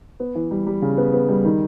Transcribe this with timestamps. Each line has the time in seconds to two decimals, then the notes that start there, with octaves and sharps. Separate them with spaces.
0.20 B3
0.35 E3
0.51 G3
0.67 G3
0.82 C#3
0.98 B3
1.13 B3
1.29 G3
1.44 D#3